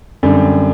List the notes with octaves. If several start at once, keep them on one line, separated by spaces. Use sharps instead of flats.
F#2 D3 G3 C4